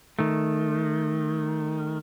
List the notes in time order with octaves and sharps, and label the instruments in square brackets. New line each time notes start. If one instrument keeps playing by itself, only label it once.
[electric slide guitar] D#3 A3